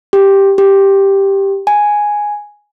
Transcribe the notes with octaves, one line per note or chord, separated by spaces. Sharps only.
G4
G4
G#5